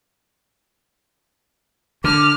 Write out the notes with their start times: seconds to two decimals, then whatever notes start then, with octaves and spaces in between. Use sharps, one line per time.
2.04 D3 D6 F6